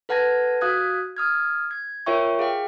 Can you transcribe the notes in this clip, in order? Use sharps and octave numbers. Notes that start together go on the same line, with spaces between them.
A4 B4 F#5 A5 G#6 A#6
F#4 F5 D#6 F#6 G#6
D#6 F6 G#6
G#6
F4 A#4 C#5 E5 G5 C#6
G#4 F5 G5